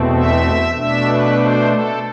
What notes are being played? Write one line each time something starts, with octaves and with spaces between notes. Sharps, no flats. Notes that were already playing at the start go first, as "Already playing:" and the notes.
Already playing: E2 B2 A3 C4
E5
B2 A3 D4 E5
B4
C5
A4